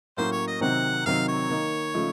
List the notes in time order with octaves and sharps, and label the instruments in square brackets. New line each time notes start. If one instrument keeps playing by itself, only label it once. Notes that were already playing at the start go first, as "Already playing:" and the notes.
[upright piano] A2 F#3 A#3 C#4 [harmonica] C5
[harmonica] C#5
D#5
[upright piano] C3 D#3 F#3 C4 D#4 [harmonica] F#5
[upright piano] C3 D#3 F#3 C4 D#4 [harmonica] F5
[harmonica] C#5
[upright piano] D#3 A#3 D#4
C#3 F3 A3 D#4